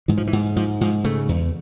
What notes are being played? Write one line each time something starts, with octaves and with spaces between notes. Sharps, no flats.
G#2 E3
F3
E3
G#2
G#2 F3
G#2 F3
C#3 A3
E2